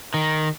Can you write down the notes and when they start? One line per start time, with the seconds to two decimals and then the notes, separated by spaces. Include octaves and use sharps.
0.14 D#3